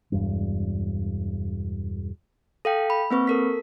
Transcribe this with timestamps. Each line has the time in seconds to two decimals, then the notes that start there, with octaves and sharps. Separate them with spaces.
0.12 E1 G2
2.65 A4 F5 G5
2.90 B5
3.10 A#3 C4 B4 C#6
3.27 A4 A#4 B6